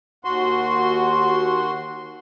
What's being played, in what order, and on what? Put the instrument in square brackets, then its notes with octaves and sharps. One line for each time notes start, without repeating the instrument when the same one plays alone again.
[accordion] D#2 F#4 C6